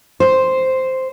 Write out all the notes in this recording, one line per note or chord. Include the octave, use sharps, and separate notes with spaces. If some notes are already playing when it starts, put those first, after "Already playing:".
C5